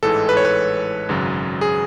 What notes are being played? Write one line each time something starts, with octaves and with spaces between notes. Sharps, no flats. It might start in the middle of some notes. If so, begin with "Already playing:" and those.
A1 G#2 E3 G#3 A4
B4
C#5
B4
G#1 F#2 C#3 F#3
G#4